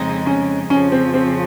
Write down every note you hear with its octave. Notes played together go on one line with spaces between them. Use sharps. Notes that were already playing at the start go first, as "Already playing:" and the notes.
Already playing: F2 C#3 G#3 C4 D#4
C#4
F2 C#3 F3 C#4
C4
C4